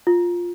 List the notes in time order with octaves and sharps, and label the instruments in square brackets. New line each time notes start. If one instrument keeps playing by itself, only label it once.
[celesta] F4